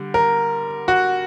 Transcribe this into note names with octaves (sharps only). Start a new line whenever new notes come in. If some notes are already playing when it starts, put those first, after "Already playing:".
Already playing: D3 G3
A#4
F#4